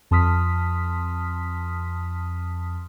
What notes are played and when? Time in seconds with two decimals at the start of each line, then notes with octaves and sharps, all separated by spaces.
0.11 F2 A5 C6 D#6 F6 B6